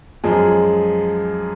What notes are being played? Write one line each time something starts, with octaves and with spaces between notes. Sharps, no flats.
F#2 F3 G#3 G#4